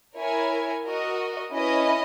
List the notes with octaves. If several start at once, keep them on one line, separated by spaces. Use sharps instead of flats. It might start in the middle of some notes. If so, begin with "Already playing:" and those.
E4 A#4 C#5 G#5
F#4 A#4 D#5
C#4 E4 B4 D#5